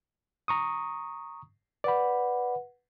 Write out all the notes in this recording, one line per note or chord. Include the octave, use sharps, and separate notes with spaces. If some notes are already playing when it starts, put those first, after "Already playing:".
A#5 C#6 D#6
B4 D5 F#5 B5